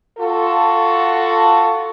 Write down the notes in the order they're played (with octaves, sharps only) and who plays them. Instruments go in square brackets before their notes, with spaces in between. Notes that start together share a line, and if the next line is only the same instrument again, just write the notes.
[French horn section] F4 F#4 A4